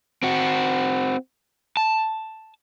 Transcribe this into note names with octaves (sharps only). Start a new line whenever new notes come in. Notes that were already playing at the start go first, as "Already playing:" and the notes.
C4 F#4
A5